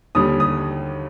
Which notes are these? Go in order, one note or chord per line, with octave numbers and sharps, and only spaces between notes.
D#2 D3 G3 D#6
D#6